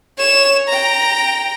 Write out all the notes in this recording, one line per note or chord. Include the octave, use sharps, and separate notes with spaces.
C#5 E7
G5 A#5